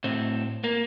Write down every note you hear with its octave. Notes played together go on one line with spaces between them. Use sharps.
A2 C4
A#3